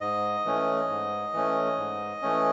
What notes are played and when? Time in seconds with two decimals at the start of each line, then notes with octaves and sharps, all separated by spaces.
0.01 G#2 D#5
0.45 E3 A3 C#4
0.89 G#2
1.33 E3 A3 C#4
1.78 G#2
2.22 E3 A3 C#4